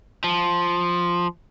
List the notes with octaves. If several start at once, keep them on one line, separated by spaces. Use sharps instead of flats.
F3